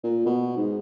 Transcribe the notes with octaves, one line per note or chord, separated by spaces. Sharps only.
A#2
B2
G#2